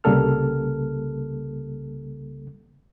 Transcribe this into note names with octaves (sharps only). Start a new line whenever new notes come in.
C2 C#3 G3 A#3 A4 F6